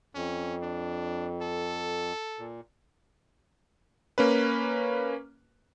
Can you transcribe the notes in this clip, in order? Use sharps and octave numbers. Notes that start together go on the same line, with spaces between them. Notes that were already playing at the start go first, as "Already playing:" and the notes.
F2 C#4
D4
A4
A#2
A#3 C#4 B4